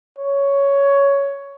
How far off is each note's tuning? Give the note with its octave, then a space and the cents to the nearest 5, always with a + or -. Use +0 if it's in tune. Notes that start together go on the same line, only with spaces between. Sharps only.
C#5 +10